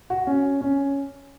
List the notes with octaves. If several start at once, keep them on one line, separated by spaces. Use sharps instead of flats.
F#4
C#4
C#4